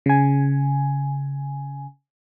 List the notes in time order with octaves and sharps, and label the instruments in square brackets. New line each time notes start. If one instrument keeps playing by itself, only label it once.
[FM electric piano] C#3 G#5